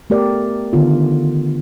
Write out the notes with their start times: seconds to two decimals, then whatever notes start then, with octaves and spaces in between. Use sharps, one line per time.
0.10 A3 B3 G4 A#4 D5
0.73 D3 D#3 B3 F4